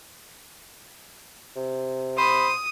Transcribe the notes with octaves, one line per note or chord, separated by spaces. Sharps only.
C3
C5 B5 D#6